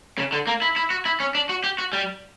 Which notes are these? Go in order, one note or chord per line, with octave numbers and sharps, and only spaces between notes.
C#3
D3
A#3
E4
E4
F#4
E4
C#4
D4
F#4
G4
F#4
G3